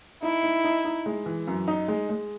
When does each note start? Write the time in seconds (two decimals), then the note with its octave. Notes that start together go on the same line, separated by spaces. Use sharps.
0.22 D#4 E4
0.43 D#4
0.64 D#4
0.85 D#4
1.06 G#3
1.26 E3
1.47 F#2
1.68 D#4
1.88 G#3
2.09 G#3